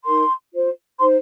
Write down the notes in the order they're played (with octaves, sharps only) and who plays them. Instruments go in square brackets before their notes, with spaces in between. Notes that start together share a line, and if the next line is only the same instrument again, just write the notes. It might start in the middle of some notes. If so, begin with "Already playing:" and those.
[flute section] D#4 A#4 C6
F4 C5
D#4 C5 C6